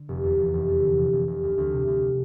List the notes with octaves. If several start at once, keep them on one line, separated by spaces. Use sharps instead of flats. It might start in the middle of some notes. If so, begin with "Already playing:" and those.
Already playing: D3
F1
E2
F1
F1
E2
D3
F1
F1
F1
D2
D2
C3
D2